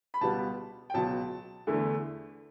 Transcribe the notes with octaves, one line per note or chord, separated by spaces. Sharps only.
B5
C#2 B2 G3 B3 A5
G5
C#2 B2 F#3 A5
E2 D3 A3